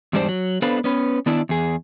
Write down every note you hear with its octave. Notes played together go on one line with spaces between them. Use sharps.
E2 G#2 G3 D4 C5
F#3
B3 D4 A4 B4 C5 F5
B3 C#4 B4
D#3 B3 D4 E4
E2 G#4